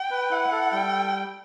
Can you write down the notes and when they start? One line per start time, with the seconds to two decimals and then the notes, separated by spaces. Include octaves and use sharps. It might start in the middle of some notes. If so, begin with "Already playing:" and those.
Already playing: G5
0.11 B4
0.31 E4 F#5
0.52 A4
0.72 G3 G5